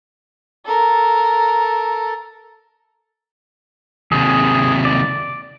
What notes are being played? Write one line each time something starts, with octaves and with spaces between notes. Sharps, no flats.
A4 A#4
D#2 C3 G#4
D5